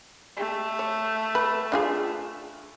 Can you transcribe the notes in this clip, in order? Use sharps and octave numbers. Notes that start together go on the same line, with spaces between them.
A3
C#5
B4
D4 F4 G#4